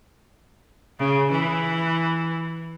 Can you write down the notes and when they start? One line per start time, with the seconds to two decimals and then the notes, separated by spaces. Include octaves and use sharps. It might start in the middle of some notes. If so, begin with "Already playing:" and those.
0.98 C#3
1.31 E3